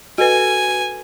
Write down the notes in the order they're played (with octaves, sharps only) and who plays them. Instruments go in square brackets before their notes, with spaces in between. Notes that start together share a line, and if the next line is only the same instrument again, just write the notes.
[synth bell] F#4 A4 B4 [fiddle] G#5